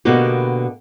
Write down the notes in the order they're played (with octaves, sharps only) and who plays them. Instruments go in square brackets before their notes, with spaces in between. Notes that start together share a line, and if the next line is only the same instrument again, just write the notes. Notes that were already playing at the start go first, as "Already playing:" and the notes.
[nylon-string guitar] B2 D3 A#3 B3 F#4 G4